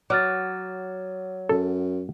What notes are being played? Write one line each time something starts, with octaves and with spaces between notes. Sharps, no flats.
F#3 D6 F6 A6
F#2 A4